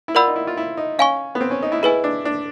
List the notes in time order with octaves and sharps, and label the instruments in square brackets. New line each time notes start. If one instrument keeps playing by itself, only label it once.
[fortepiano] E4
[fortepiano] F4 [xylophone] A#4 D5 F#5 B5 E6
[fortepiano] D#4
E4
F4
E4
D#4
[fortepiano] C#4 [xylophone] F5 G#5 C#6
[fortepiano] B3
C4
C#4
D#4
E4
[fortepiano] E4 [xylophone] G#4 B4 D#5 G#5
[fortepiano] D4
D4